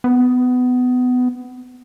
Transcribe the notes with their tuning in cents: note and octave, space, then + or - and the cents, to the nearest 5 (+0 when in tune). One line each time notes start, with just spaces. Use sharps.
B3 +20